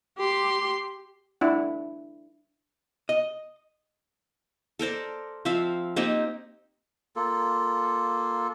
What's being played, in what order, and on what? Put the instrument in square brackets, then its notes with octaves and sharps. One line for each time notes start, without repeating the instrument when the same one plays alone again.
[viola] G4 C6
[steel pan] D4 E4 F#5
[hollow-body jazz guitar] D#5
[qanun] A4 A#4 C5 D5
F3 C4 E5 F5
A#3 C4 D#4 G4
[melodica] A#3 F4 A4